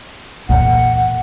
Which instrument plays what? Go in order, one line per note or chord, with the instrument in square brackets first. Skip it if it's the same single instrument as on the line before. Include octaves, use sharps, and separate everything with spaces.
[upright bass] E2 A#2 [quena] F#5